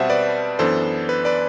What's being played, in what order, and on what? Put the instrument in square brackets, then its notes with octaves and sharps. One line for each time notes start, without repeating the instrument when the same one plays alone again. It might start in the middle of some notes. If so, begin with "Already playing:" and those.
Already playing: [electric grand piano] B2 G3 C4 C5 E5 F#5 A5
B4 D5
F#2 E3 B3 D4 A4 C5
B4
B4 D5